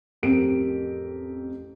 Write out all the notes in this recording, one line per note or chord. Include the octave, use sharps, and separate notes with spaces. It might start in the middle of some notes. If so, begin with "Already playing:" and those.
A1 F2 C4 G4 A#4 D7